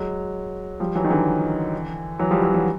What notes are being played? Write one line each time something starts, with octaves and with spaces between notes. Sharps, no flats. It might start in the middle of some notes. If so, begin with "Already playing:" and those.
Already playing: F#3 G#3
F3 G3
E3 F#3
D#3
D3 E3
E3 F#3
F3 G3
E3 F#3
E3 F#3